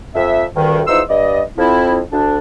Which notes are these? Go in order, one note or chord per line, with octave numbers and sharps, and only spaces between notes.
F2 E5
D2 G2 D#3
E2 E3 F3 D#4 C6 E6
G2 D5 D#5
F2 F3 C4 E4
D2 D4